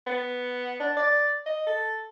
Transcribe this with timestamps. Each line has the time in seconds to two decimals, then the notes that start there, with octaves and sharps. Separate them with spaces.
0.06 B3
0.80 D4
0.97 D5
1.46 D#5
1.67 A4